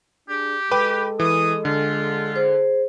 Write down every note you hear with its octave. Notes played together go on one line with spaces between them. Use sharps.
D4 G4 G#4
G#3 A4 B4 G5 D6
E3 D#6
D3 F4
G#4 C5